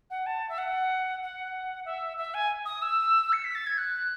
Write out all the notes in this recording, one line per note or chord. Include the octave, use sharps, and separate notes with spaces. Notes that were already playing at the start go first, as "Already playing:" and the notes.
F#5
A5
E5
F#5
F#5
E5
E5
G#5
D#6
E6
C#7
B6
A6
G#6
F#6